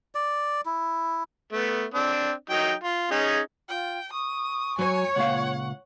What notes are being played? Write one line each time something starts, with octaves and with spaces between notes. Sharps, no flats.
D5
E4
A3 B3
C4 D4
F#3 D#4 G5
F4
C#4 D#4 G#4
F4 G5
C#6 D#6
F#3 C#5 G#5
C#2 A#2 F5 F#5